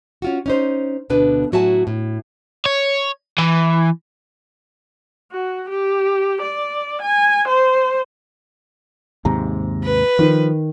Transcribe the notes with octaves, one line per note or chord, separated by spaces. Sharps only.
C#4 F4 F#4
C#4 D#4 C5
D2 B2 D4 B4
A2 F#3 F#4 E5 G#5 A5
A2
C#5
E3
F#4
G4
D5
G#5
C5
D#2 G#2 C3 A#5
B4
D#3 F3